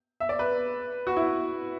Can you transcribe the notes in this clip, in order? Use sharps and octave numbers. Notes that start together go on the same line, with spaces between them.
E5
D5
B4
F#4
E4